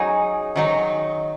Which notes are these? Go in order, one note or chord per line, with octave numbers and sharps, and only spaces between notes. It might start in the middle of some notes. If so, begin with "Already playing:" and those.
Already playing: F#3 D#4 G#4
D#3 F#3 D#4